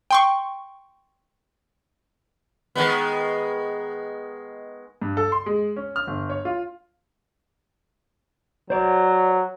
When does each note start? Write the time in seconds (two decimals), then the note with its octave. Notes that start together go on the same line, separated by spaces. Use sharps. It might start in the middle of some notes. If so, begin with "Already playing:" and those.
0.11 G5 C6 C#6
2.75 D#3 G#3 B3
5.02 G2
5.17 A4
5.32 C6
5.46 G#3
5.76 C#4
5.96 F6
6.07 G1
6.30 C#5
6.45 F4
8.70 F#3 C5 D5